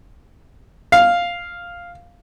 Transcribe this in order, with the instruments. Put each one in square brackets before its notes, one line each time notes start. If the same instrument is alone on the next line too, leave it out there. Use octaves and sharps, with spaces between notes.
[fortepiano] F5